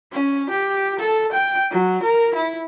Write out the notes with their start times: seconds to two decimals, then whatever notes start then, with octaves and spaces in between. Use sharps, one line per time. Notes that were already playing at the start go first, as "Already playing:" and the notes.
0.12 C#4
0.50 G4
0.99 A4
1.32 G5
1.71 F#3
2.03 A#4
2.34 E4